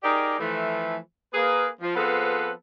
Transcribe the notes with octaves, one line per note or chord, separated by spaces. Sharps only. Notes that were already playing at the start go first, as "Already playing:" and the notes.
D#4 G4 G#4 A#4 D5 D#5
E3 F3 A3
A#3 G#4 B4
F3
F3 B3 C4 G#4 A4 B4